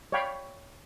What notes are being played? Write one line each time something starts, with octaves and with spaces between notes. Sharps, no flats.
C#5 D5 F5 G5 B5